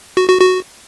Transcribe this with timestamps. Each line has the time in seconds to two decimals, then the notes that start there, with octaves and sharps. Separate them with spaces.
0.17 F#4
0.29 F#4
0.40 F#4